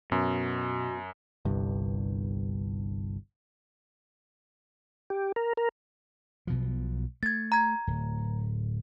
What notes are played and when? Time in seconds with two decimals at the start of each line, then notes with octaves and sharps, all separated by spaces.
0.12 F#2 B2
1.45 G1 C2 G2
5.10 G4
5.36 A#4
5.57 A#4
6.47 B1 B2 F3
7.23 A3 G#6 A6
7.52 A#5 G#6
7.87 D1